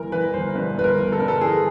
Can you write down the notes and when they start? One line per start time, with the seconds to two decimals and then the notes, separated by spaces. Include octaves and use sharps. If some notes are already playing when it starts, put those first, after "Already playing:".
Already playing: G1 E3 A#4
0.12 E3 B4
0.34 G1 C5
0.55 G2 B4
0.77 G1 B4
0.84 A#4
0.98 G1
1.12 A4
1.19 G2 A#4
1.28 A4
1.41 E3 G#4